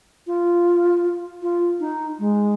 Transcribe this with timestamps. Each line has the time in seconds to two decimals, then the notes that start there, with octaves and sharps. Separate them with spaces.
0.27 F4
1.42 F4
1.80 D#4
2.19 G#3